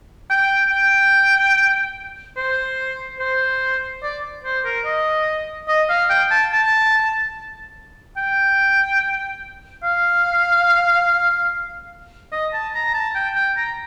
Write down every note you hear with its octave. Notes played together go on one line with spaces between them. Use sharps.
G5
G5
C5
C5
D5
C5
A#4
D#5
D#5
F5
G5
A5
A5
G5
F5
D#5
A5
A#5
A5
G5
G5
A#5